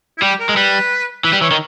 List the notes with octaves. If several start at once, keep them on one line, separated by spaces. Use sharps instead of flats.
E4
G3 G4
A#4
G#3
G3 B4
E3 B4
G3
E3 C#5
D#3